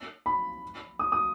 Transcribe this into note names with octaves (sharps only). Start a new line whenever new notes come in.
B5
D#6
D#6